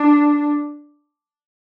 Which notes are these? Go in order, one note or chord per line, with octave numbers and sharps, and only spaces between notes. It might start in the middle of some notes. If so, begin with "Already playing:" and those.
Already playing: D4